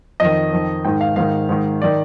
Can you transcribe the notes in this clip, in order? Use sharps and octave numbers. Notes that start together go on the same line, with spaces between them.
F2 D#3 D#5
F2 D#3
G#2 D#3 G5
F5
G#2 D#3 F5
G#2 D#3
D#3 D5